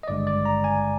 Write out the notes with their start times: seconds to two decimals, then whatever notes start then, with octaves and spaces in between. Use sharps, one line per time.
0.03 D#5
0.08 G#1 G2 D3 G#3 D5
0.27 D5
0.45 A#5
0.64 G#5